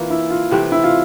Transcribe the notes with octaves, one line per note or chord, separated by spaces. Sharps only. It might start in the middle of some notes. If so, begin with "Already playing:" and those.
Already playing: E3 A#3 C4 F4
E4
F4
C3 E3 A3 C4 G4
E4
F4